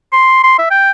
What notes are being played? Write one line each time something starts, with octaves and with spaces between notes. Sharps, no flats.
C6
C6
E5
G5